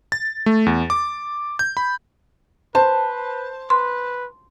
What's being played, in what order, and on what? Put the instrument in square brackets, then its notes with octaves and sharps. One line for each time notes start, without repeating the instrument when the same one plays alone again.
[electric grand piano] A6
A3
E2
D6
G6
B5
[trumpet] B4 [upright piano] C5 [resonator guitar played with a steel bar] A5
[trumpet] B4 [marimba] C6